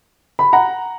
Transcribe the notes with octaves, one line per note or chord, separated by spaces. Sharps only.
B5
F#5 A#5